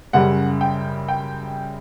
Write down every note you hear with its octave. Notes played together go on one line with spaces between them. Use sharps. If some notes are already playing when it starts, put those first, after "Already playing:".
F#2 C#3 G3 F#5
G5
G5